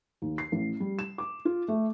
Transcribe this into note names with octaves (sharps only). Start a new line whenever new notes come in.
D#2
C7
A1
G3
E7
D6
F4
A3